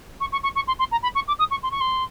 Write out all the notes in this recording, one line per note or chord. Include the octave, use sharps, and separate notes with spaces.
C#6
C#6
C#6
C#6
C6
C6
A#5
B5
C#6
D6
D#6
C#6
C6
C#6
C6